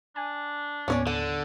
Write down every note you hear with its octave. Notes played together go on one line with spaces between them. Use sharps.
D4 G#5
D#2 A2 B3 C#4 C#5 D5
D3 F#5